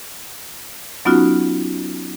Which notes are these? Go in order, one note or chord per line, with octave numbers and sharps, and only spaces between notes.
F#3 B3 C#4 D#4 F4 F#4